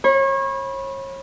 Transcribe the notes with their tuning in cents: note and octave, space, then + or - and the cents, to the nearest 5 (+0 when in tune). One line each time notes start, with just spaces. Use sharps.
C#5 -35 B5 -15